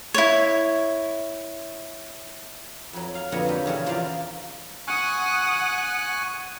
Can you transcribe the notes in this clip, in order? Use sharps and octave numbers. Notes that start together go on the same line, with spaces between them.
E4 C#5
F2 F#3
F5
F2 A#2 D3 B3 F#4 C#5
F#3 G3
E2 C#3 F#4 C#5
E2 F3 F4 A#4 D5 F5
F#5 G#5 C#6 D#6 F#6